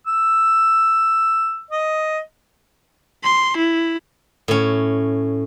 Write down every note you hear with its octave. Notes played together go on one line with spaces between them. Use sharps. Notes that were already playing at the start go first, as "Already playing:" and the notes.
E6
D#5
C6
E4
A2 C#4